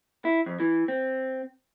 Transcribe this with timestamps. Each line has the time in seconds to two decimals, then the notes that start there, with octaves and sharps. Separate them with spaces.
0.25 E4
0.46 F2
0.60 E3
0.88 C4